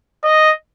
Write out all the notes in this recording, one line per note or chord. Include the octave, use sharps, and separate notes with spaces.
D#5